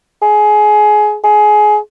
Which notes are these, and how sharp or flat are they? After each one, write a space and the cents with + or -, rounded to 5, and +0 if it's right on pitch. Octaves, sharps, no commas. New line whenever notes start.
G#4 +20
G#4 +20